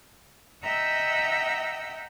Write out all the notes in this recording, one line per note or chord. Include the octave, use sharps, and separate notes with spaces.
D#5 E5 F#5 G5 A#5 E6